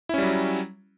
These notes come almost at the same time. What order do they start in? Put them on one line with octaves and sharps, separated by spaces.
E4 C#4 G3 F#3